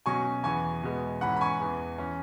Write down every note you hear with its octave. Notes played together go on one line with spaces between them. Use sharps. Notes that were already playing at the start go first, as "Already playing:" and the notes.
B2 F#3 C#4 G#5 C#6
E2 E3 B3 G#5 C#6
E2 B2 G#3 B3
G#2 E3 C#4 F#5 B5
B5
G#5 C#6
E2 E3 B3
E3 C#4